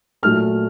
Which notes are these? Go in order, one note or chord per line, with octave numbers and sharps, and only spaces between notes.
A#2 F#3 A3 F6